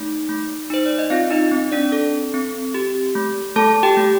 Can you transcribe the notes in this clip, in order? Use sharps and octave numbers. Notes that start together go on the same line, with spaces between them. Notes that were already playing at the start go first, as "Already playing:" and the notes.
Already playing: A3 D#4
A3
D#4 C5
D5
D#5
C4 F4 F5
D#4 D#5
C4
D4 D5
A4
C4
G4
A3
A3 A4 A5
G4 G5
A3